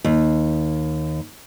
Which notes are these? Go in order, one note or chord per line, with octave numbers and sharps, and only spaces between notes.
D#2